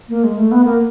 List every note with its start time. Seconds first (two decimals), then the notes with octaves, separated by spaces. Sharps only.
0.09 A#3
0.24 G#3
0.37 A3
0.51 B3
0.65 A#3